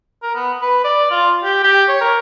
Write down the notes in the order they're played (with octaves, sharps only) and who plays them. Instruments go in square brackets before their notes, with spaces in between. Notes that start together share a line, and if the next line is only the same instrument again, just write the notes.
[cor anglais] A#4
B3
B4
D5
F4
G4
G4
C#5
A#4